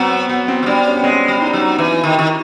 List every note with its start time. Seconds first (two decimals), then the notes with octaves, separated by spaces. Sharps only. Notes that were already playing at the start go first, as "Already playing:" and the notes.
Already playing: F#3 B3 C4
0.29 F#3 B3
0.48 C4
0.63 F#3
0.66 G3 D4
0.86 C#4
0.97 B3
1.04 G#3 C4
1.28 G3
1.42 D#4
1.53 F#3
1.78 E3 E4
2.04 D#3
2.16 D#3 G4